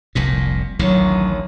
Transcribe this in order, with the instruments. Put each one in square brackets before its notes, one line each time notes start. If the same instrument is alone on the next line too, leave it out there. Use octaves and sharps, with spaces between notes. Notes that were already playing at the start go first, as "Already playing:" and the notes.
[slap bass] F1 C2 A#2
[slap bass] A1 D2 D#3 [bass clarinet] F#3